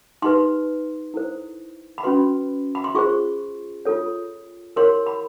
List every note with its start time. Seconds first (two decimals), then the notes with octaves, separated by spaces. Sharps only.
0.22 D#4 G4 B4 C6
1.14 E4 A4 C5
1.98 B5
2.03 C#4 F#4 B4 C6
2.75 B5
2.84 C6
2.95 F4 G#4 C5 C#6
3.85 F4 A4 C#5
4.76 E4 G4 A#4 C#5 C6
5.06 B5